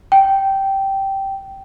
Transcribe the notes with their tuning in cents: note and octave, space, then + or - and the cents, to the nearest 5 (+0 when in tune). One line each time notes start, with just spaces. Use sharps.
G5 -10